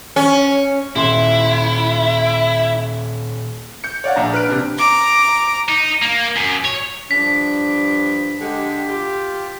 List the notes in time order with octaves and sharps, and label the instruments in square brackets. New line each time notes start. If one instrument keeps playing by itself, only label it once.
[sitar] C#4
[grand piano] D#1 C6 E7 [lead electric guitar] E4
[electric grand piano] G6 C#7
C#5 D5 F5 F#5
A#1 D4 A#5
B4 F6 F#6 D7
C3 D4
[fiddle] A#5 D6
[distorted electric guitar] D#4
A#3
F#2
C#5
[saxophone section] G2 F3 D4 [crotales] B6
[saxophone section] D3 G#3 G4
F4 G4